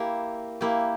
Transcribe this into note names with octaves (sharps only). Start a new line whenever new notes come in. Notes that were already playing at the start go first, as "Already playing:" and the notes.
Already playing: A#3 E4 G4
A#3 E4 G4